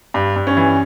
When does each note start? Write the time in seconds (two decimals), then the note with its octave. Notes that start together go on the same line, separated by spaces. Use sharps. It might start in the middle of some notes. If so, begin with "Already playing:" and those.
0.14 G2
0.36 G2
0.47 C#4
0.57 E3